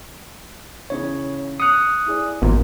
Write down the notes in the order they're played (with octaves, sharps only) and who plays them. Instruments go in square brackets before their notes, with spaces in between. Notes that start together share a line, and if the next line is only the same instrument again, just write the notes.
[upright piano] C#3 E3 [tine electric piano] C#5
[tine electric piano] D#6 F#6 [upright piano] C#7 F7
[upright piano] E4 G#4 D5
[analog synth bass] A1 [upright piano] F#2 [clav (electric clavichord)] A#2